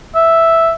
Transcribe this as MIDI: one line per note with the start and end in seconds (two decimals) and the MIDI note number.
0.15 0.72 76